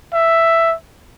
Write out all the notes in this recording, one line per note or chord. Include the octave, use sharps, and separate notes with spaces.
E5